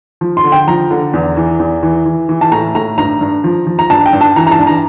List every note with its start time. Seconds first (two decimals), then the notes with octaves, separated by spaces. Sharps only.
0.21 F3
0.37 C6
0.44 D3
0.52 G5
0.67 F3 A#5
0.91 D3
1.13 E2
1.37 E3
1.59 E2
1.83 E3
2.06 E3
2.29 E3
2.41 A5
2.52 A2 A#5
2.75 A2 A#5
2.98 G2 A#5
3.21 G2
3.44 F3
3.67 F3
3.79 A#5
3.90 G2 A5
4.06 G5
4.13 G2
4.21 A5
4.36 E3 A#5
4.47 A#5
4.51 A5
4.59 G2
4.67 A#5